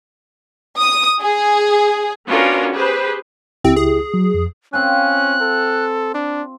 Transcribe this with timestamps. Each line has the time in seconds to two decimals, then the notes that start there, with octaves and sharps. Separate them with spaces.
0.77 D#6
1.22 G#4
2.28 B3 C#4 D4 F4 F#4 A#4
2.74 G4 G#4 B4 C5
3.64 C#2 C4 E4 G4
3.76 G#4
4.14 F#3
4.34 F2
4.73 C4 C#4 F4 G#5 F#6
5.42 A4
6.14 D4